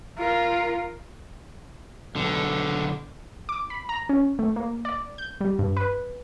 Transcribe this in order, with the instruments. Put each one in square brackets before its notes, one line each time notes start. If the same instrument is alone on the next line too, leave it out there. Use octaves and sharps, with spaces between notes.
[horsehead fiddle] F4 A#4
[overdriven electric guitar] B1 D3
[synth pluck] D6
B5
A#5
C#4
A3
A#3
D5
G6
G3
G2
B4